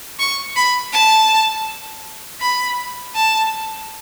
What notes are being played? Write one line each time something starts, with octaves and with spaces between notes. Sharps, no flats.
C#6
B5
A5
B5
A5